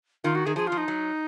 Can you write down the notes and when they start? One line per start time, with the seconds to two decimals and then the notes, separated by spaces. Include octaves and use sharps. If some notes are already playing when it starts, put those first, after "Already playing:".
0.24 D#3 F4
0.35 F#4
0.46 D#3 G#4
0.56 F3 G#4
0.67 F3 F4
0.77 D#4
0.88 F#3